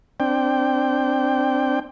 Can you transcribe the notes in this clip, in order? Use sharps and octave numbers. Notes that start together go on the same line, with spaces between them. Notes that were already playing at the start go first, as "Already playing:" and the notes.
C4 D4 G5